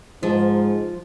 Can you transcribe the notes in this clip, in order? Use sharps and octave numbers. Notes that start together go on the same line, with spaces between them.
G#2 F3